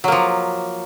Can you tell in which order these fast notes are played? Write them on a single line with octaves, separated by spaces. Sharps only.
F#3 A#3 F3